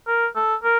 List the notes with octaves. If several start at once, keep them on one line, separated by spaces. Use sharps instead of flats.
A#4
A4
A#4